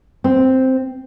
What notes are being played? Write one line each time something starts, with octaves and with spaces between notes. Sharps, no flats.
C4